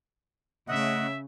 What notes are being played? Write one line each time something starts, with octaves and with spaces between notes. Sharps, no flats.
C#3 A3 D#5 E5 F#5